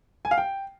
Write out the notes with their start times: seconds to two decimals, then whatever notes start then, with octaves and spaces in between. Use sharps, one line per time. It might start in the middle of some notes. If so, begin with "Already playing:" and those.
0.25 G#5
0.31 F5
0.38 G5